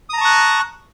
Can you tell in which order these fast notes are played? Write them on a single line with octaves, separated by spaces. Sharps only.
D#6 A#5 A5 C#6 F#6